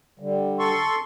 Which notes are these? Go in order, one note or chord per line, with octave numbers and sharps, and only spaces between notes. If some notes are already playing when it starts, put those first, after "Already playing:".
D3 G3
A4 C6 C#6